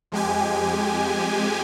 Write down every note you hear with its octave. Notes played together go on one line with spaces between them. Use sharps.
F2 G#3 G4 G#5